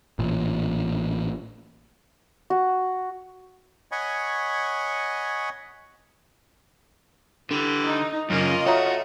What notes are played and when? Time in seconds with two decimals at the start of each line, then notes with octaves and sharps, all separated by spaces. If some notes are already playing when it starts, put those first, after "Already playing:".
0.19 A1 A#2
2.50 F#4
3.92 C#5 D#5 F#5 G#5 B5 C#6
7.51 D3 E3 G3
7.85 D#4
8.30 F#2 C#3 A#3 C#4 F4 D#5
8.66 A3 F#4 C#5 E5 A#5